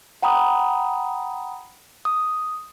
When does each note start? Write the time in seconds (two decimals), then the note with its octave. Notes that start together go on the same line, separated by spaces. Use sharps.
0.22 F#5 G5 A#5 B5 D#6
2.05 D#6